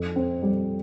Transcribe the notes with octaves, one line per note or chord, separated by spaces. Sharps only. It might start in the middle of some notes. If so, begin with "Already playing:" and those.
Already playing: F2
C4
G3